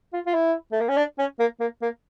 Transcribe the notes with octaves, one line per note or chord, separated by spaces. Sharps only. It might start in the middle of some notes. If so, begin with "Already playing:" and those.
F4
F4
E4
A3
A#3
C#4
D4
C#4
A#3
A#3
A#3